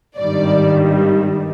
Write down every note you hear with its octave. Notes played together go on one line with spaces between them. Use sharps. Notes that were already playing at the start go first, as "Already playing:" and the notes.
G#1 G2 D#3 G3 D5